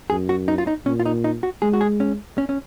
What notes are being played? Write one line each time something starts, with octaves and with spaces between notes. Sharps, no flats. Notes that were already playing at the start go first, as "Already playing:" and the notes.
F#2 G#4
F#4
D#4
F4
D#4
A#2 C#4
F4
D#4
D#4
F#4
G#3 G#4
F#4
G#4
C#4
C#4
C#4